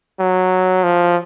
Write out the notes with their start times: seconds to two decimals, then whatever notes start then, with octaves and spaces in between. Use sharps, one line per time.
0.19 F#3
0.83 F3